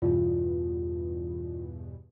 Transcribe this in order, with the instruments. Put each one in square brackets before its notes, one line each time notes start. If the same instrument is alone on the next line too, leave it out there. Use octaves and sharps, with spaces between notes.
[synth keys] E2 G2 B2 [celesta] F4